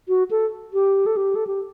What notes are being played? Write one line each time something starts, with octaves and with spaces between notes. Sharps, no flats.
F#4
A4
G4
A4
G4
A4
G4